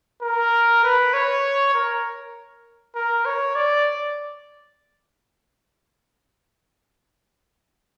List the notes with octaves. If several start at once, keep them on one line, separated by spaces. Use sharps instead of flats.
A#4
B4
C#5
A#4
A#4
C#5
D5